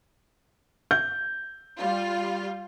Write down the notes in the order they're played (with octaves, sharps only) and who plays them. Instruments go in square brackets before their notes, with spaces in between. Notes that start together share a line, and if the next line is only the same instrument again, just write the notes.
[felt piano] G6
[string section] G3 F4